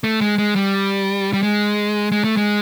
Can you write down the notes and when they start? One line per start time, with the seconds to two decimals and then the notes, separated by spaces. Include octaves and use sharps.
0.04 A3
0.21 G#3
0.38 G#3
0.56 G3
1.33 G3
1.43 G#3
2.12 G#3
2.24 A3
2.37 G#3